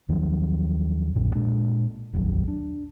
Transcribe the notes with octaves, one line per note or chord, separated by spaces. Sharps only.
D#2 D#3 F3 F#3
A#1 F#2 A#2
A#2 G#3 D4
F1 A#1 D#2 F#3
D4